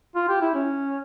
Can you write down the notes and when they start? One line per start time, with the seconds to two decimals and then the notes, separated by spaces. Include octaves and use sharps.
0.16 F4
0.29 G4
0.41 E4
0.55 C#4